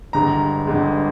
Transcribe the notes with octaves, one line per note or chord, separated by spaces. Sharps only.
G1 G2 D3 G#3 A#5
G1 G2 D3 G#3